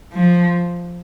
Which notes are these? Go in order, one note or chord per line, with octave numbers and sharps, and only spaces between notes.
F3